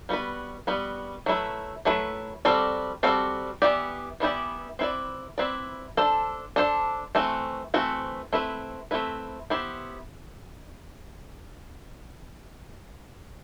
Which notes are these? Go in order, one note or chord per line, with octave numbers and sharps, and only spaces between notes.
G3 B3 F#4 B4
G3 B3 F#4 B4
F#3 A3 E4 B4
F#3 A3 E4 B4
G3 C4 F#4 A4 D5
G3 C4 F#4 A4 D5
E3 B3 E4 G4 D5
E3 B3 E4 G4 D5
C4 E4 B4 D5
C4 E4 B4 D5
D4 A4 C5
D4 A4 C5
E3 A3 C4 F#4
E3 A3 C4 F#4
A3 C4 E4 B4
A3 C4 E4 B4
B3 E4 G4 C5